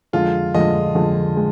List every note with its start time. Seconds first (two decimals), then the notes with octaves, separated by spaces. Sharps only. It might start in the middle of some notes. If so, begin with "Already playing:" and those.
0.13 F2 D3 G#3 F4
0.54 F2 D3 G#3 D#5
0.95 F2 D3 G#3
1.37 G#3